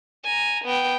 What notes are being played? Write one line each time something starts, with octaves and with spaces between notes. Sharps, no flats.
G#5 A#5
B3 G5